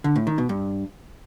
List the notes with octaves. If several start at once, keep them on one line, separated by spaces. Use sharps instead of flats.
D3
A2
D#3
B2
G2